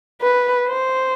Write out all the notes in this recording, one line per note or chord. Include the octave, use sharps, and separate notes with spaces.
B4
C5